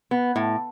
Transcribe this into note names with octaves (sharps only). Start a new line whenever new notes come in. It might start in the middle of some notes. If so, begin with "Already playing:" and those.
B3
A2